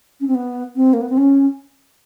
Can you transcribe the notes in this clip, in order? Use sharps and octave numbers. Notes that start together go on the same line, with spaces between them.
C#4
C4
B3
C4
A#3
B3
C4
C#4